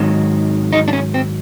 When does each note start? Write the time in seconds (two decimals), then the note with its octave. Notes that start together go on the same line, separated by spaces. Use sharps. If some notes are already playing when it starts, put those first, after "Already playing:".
Already playing: G#2 D#3 F#3
0.73 D#4
0.88 D4
0.93 C#4
1.14 C4